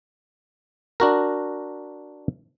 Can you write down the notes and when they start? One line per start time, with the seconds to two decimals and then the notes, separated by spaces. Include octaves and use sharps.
1.00 D4 F#4 A#4